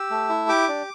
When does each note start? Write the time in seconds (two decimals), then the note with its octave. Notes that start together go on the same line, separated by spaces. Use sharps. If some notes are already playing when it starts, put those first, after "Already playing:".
Already playing: G4 E6
0.10 A3
0.29 E4
0.48 G4 D6
0.68 D4